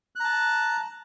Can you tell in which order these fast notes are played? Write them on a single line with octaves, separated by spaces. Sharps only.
F#6 A#5 A5